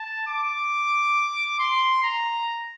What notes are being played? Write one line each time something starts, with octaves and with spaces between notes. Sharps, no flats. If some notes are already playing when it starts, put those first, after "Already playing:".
Already playing: A5
D6
C6
A#5